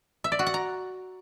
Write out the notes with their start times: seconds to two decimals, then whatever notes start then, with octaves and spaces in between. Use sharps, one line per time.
0.24 E5
0.32 D5
0.39 F#4
0.47 F#5
0.54 A#5